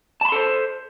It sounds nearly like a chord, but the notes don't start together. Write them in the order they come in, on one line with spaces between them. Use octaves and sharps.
A5 B5 C6 A4 C5